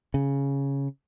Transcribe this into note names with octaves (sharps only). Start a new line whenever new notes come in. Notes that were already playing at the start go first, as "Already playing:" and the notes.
C#3